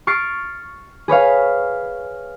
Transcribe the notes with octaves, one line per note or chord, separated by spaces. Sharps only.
C#6 F6 A6 C7 D7
G#4 B4 C#5 F5